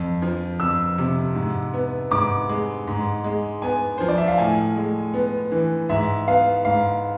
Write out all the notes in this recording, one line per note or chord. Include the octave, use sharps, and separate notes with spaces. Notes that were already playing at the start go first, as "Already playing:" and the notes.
Already playing: F2
F3
F2 E6
C3
G#2
B3
G#2 D6
G#3
G#2
G#3
B3 G#5
F3 C5
D5
E5
F5
A2 G#5
G#3
B3
E3
G#2 E5
B3 F5
G#2 F5